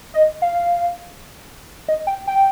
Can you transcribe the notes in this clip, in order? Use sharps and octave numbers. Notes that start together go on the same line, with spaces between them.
D#5
F5
D#5
G5
G5